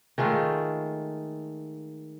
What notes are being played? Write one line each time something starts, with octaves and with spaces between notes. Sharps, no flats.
D#3 G#3 A3 F4